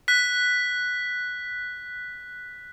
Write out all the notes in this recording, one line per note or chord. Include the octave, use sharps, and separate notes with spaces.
F#6 B6